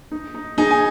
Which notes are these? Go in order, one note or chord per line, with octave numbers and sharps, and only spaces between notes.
D#4
D#4
D#4 G#4
G#5